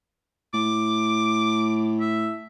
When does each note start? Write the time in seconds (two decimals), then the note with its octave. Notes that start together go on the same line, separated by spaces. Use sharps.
0.54 A2 D6
2.00 E5